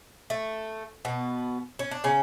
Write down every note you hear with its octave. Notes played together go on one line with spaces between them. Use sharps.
A3
B2 B3
C#4
D4
C#3 C#4